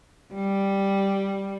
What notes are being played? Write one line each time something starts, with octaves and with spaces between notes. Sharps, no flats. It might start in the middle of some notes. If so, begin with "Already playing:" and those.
G3